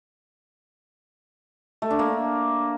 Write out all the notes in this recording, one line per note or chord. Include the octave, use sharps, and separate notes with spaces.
A3
D4
A#3